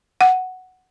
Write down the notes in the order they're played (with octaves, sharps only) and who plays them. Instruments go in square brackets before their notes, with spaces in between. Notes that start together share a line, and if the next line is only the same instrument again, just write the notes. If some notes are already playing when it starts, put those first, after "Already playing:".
[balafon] F#5